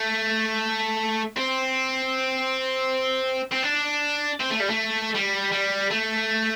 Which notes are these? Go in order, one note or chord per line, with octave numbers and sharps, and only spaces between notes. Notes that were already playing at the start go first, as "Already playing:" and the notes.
Already playing: A3
C4
C4
D4
C4
A3
G3
A3
G3
G3
A3